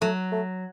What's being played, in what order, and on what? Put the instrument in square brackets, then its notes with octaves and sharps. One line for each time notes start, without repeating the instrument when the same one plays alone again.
[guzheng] F#3 [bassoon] A3
[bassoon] A3